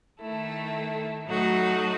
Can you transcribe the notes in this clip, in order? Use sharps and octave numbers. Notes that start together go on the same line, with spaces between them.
D#3 A3 E4 A4
A2 F#3 A3 D#4 F#4